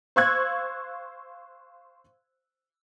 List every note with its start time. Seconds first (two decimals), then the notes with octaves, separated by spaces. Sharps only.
0.16 C5 F5 C#6 E6 F#6 G#6